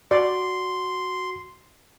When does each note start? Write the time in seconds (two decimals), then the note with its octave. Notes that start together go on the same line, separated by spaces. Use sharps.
0.11 F#4 D5 C6